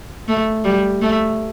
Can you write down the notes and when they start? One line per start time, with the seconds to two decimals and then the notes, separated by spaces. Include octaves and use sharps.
0.28 A3
0.64 G3
1.02 A3